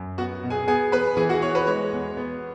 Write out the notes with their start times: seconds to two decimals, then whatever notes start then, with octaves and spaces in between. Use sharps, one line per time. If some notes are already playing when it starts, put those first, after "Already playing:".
Already playing: F#2
0.18 B3 F#4 F#5
0.43 B2
0.50 G#4 G#5
0.67 B3 G#4 G#5
0.92 E2 B4 B5
1.17 E3 G#4 G#5
1.29 F#4 F#5
1.42 B3 C#5
1.55 B4
1.67 G#3 C#5
1.92 E2
2.17 B3